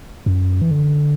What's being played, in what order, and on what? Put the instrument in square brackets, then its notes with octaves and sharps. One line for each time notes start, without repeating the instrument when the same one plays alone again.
[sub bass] F#2
E3
D3